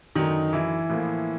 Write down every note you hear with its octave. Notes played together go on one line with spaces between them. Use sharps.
F#2 D3 D#3 F#3 A3 D#4
E3 E4
A2 F3 A#3